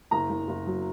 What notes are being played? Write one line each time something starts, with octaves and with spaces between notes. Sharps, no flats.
F#1 A#5
F#1
F#1
F#3